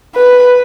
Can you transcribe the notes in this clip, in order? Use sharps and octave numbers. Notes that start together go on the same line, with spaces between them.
B4